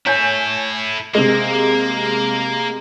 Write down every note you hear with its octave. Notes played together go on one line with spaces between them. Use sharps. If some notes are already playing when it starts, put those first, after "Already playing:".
E4 A4 C#5 G#5 G6
C3 G#3 A#3